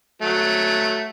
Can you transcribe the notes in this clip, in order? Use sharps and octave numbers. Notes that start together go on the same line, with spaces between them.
F#3 A3